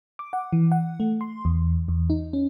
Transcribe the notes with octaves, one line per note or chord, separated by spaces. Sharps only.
D6
F#5
E3
F#5
A3
C6
E2
E2
D#4
C#4